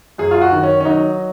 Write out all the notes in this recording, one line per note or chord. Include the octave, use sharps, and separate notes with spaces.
F#2 G#4
F4
F#4
D#3
C#4
C#4
F#3 D#4